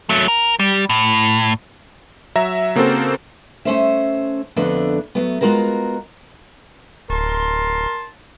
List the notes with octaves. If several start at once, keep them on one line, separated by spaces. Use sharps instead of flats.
F#3 A3
A#4
G3
A2
F#3 E5 A#5 A#6
C#3 A#3 C4 F#4 A4 C5
A3 C#4 C5 E5
F2 D3 A3 B3 D4
F#3 A3 B3
G#3 B3 F4 F#4 A#4 A#5
D1 A#4 A5 C6